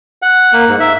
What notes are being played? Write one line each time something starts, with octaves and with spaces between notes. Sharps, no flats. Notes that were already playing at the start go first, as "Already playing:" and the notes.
F#5
A#3
G#2
E5